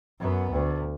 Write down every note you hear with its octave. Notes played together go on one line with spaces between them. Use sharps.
F#2 B3
D2